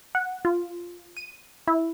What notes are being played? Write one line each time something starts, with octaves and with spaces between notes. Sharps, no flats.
F#5
F4
D#7
E4